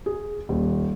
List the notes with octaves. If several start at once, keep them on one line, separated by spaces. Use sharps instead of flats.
G#4
D#1